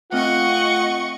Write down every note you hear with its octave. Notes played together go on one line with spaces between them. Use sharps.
A3 C4 F4 D#5 F#5 C#6 F#6